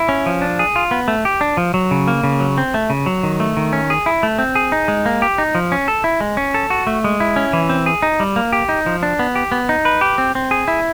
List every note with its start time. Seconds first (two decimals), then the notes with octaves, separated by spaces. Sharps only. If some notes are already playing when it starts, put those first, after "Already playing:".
Already playing: E4
0.09 C#4
0.26 F3
0.42 D4
0.59 G#4
0.76 F4
0.91 B3
1.08 A3
1.25 G4
1.41 D4
1.57 F3
1.74 F#3
1.91 C#3
2.07 A#3
2.24 C#3
2.40 F#3
2.58 C4
2.74 A3
2.90 C#3
3.06 F#3
3.23 D#3
3.40 A3
3.57 D#3
3.73 C#4
3.90 G#4
4.06 E4
4.23 A3
4.39 C4
4.55 G#4
4.72 D#4
4.88 G#3
5.06 A#3
5.22 G4
5.38 D#4
5.55 F3
5.72 C#4
5.88 A4
6.04 E4
6.21 G#3
6.37 C#4
6.54 A4
6.70 F#4
6.87 A3
7.04 G#3
7.20 E4
7.36 C#4
7.53 E3
7.69 C4
7.86 G#4
8.02 D#4
8.20 G3
8.36 A#3
8.53 G4
8.69 D#4
8.86 F3
9.03 D4
9.19 B3
9.35 G4
9.52 B3
9.69 D#4
9.85 B4
10.01 G4
10.18 C4
10.35 C4
10.51 G#4
10.68 E4